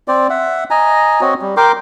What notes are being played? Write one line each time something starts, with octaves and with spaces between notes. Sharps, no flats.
C4 C5 D5
E5 F#5
D#5 G#5 A#5
C4 F#4 C#5 D#5
G3
A#4 G5 C6 D6